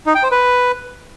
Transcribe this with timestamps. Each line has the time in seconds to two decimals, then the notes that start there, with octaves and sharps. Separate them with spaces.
0.07 D#4
0.15 G5
0.23 C5
0.32 B4